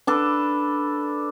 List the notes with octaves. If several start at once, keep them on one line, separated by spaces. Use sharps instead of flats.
D4 A4 B4